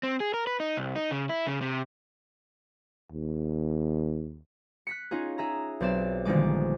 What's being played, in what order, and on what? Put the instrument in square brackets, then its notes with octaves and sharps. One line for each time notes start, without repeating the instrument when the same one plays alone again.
[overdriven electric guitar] C4
G#4
A#4
B4
D#4
C2
D#4
C#3
E4
C#3
C3
[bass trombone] D#2
[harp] F#6 B6 C#7
C#4 D#4 F4 G#4
G#4 E5 A#5
B1 C4 D5 E7
A#1 D3 D#3 G3 G#3 D6